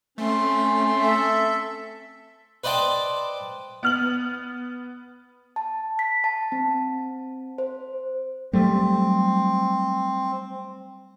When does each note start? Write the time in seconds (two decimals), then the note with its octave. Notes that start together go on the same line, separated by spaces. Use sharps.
0.18 A3 C4 C#4 C6
1.00 A4 E5
2.64 B4 C5 D5 D#5 G5 A5
3.83 B3 F6 F#7
5.56 A5
5.99 B6
6.24 A5
6.52 C4
7.58 C5
8.53 F#3 G3 A3 C4